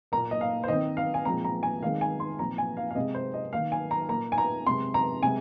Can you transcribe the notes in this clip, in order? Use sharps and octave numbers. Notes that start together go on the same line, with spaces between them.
A#2 A#3 A#5
D#5
F5
C5
D#3 C4 D#5
F5
G#5
A#2 F3 G#3 C4 A#5
A#5
G#5
D#3 G#3 C4 F5
G#5
C6
A#2 F3 C4 A#5
G#5
F5
F5
C3 G#3 C4 D#5
C5
D#5
D#3 A#3 F5
G#5
A#5
A#2 A#3 A#5
G#5
A#5
C3 G#3 C4 C6
A#5
C3 G#3 G#5